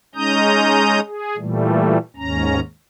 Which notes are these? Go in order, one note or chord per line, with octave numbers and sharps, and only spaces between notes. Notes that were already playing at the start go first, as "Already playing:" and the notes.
G#3 C#4 D#4 A#5 D#6 G6
G#4
A#2 E3 G3 A3
D#2 G#2 C#4 A#5